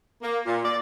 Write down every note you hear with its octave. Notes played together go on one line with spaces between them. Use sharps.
A#3
A#2
D5